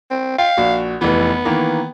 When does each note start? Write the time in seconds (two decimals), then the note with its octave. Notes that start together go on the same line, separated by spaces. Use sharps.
0.11 C4
0.39 F5 G5
0.57 A#1 F#4
1.01 F1 E3 B3
1.45 D#3 E3 A#3